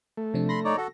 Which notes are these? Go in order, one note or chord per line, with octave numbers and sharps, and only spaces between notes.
A3
C3 F3 D4
B5 C6 A#6
D#4 C#5 D5
F#4 A4